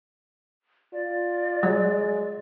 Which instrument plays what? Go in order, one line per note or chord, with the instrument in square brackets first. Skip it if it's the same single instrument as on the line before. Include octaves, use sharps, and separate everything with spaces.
[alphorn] F4 [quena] D5
[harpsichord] F#3 [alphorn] G#3